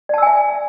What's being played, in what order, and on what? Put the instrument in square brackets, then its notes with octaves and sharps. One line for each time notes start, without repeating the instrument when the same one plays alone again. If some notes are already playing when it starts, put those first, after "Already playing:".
[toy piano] D5
A5
E6
G#5
E5